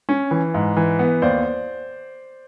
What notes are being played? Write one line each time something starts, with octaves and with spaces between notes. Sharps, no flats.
C#4
E3
G#2
E3
B3
D#2 C5 D5